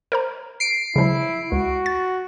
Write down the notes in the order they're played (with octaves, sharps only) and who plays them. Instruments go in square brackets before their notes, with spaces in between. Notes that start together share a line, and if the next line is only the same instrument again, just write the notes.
[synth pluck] A#4 C5 A#5
[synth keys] C7 D7
[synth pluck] C#3 F3 F#3 [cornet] E4
[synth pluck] C#2 [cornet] F#4
[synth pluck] A6